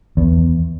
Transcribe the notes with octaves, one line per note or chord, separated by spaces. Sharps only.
E2